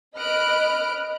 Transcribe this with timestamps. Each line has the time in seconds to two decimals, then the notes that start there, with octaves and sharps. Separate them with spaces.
0.15 D#5 B5 F6 F#6 D7